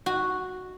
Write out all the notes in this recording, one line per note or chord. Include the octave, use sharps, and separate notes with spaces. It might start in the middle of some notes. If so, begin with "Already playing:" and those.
F#4